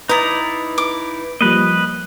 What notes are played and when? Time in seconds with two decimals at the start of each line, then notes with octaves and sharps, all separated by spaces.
0.09 D#4 E4 B4 D5 A#5 D#6
0.78 D6
1.41 F3 G3 A#3 B4 D#5